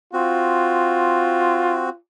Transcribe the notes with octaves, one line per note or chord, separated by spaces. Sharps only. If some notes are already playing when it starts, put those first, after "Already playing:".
C4 F4 F#4